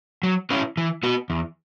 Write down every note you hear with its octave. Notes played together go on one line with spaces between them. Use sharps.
F#3
C#4 E4 B4
E3
B3 F#4 B4
E2